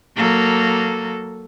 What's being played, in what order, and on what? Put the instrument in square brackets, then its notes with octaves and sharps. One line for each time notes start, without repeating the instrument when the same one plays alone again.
[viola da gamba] F#3 A#3 A4